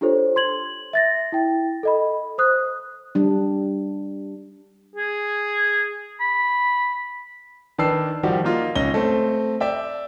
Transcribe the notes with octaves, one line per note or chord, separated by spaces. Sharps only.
D4 F4 G4 A4 C5 C#5
C6 G#6 F#7
E5 A6 A#6
E4 G5
A4 D#5 B5
C5 D#6 F#6
G3 D4
G#4
B5
D#3 D4 B4 A5 E6 C7
D#3 F3 G3 F#4 G4
A#3 D#4 F4
C#2 C#4 A#6 G7
A3 C4
D5 E5 G5